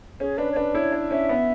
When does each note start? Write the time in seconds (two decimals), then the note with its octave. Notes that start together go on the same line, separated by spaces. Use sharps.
0.20 C#4 G#4
0.38 D4 B4
0.52 C#5
0.56 D4 B4
0.75 E4 C#5
0.92 D4
1.11 C#4 E5
1.29 B3